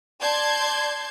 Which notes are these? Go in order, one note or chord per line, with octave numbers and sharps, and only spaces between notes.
D5 A5 C6 G6 G#6